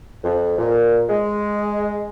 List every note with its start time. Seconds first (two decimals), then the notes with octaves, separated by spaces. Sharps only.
0.23 F2
0.58 A#2
1.09 G#3